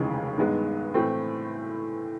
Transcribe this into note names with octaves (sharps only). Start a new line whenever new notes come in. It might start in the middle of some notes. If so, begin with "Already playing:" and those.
Already playing: F1 D#2 C#3 E3 G#3
G2 D#3 G#3 B3
A2 E3 A3 C4